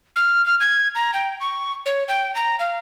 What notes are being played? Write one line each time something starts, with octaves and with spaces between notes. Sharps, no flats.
F6
F6
G#6
A#5
G5
C#6
C#5
G5
A#5
F5